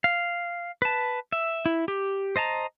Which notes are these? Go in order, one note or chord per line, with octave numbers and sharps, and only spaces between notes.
F5
B4 A5
E5
E4
G4
C5 D#5 A5 A#5